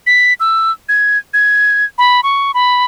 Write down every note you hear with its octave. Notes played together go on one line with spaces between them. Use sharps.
B6
E6
G#6
G#6
B5
C#6
B5